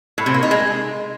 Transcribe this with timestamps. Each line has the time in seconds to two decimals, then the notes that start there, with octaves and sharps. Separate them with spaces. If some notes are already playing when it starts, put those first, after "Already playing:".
0.18 A2
0.26 C3
0.34 A#3
0.43 D#4
0.51 G#3